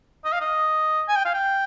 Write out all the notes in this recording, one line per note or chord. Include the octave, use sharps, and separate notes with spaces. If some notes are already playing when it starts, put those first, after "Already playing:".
D#5
F5
D#5
G#5
G5
F5
G5